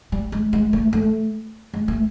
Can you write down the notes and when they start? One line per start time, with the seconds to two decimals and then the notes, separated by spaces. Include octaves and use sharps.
0.12 G3
0.32 G#3
0.53 G#3
0.73 A3
0.93 A3
1.74 G#3
1.88 A3